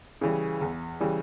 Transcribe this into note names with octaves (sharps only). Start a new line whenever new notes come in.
C#3 E3 G3
E2
C#3 E3 G3